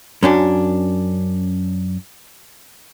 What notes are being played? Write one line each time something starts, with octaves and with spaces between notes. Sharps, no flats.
F#2 C#4 D4